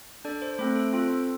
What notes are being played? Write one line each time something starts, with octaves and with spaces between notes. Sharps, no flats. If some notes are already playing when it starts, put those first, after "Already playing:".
D4 A4 D5
C5
A3 C4 A4 C5
A4
C4 F4 A4
C5
A4